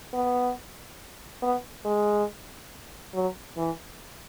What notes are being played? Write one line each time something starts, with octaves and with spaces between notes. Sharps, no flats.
B3
B3
G#3
F#3
E3